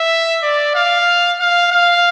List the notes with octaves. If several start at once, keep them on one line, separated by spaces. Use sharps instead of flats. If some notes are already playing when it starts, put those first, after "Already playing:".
Already playing: E5
D5
F5
F5
F5